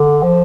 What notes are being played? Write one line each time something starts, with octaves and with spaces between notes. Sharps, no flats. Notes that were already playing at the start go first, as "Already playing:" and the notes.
Already playing: D3
F3